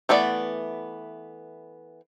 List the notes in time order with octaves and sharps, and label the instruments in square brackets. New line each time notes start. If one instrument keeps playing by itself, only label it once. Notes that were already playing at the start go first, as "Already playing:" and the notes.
[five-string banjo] E3 A3 B3 D5